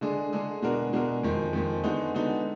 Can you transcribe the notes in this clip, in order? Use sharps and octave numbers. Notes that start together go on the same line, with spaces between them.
D3 G#3 D4 G#4
D3 G#3 D4 G#4
B2 G#3 D4 F#4 A#4
B2 G#3 D4 F#4 A#4
F2 D#3 G#3
F2 D#3 G#3
D3 G#3 B3 D#4 F#4
D3 G#3 B3 D#4 F#4